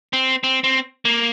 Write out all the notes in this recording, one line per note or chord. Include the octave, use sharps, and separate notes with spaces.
C4
C4
C4
A#3